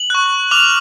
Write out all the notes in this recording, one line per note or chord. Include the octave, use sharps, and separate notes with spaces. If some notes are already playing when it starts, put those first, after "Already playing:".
Already playing: F#7
C#6 F#6
D6 F6 F7